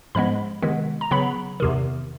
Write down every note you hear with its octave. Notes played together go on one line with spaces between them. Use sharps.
G#2 F3 G#3 B3 B5
C3 D#3 G#3 B3
A#5
C#3 F#3 B3 B5
E2 C3 D#3